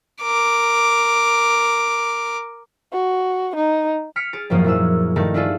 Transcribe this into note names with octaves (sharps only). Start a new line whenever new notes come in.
A#4 D6
F#4
D#4
F6 B6 C#7 D7
G#4 A6 D7
G#1 F#2 F3 A#3 D#6
A#2 E4 G#4 E6
G2 D#3 A3 D#4 A#4 A5
D4 E4 F4 G#4 A4